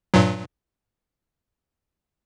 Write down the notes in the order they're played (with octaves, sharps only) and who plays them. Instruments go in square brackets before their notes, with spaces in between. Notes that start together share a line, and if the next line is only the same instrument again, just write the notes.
[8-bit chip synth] G2 A#2 F#3